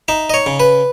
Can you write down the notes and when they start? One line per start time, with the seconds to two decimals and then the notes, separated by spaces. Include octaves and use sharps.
0.08 D#4 E5
0.30 D#5
0.34 C#5
0.46 C#3
0.60 B4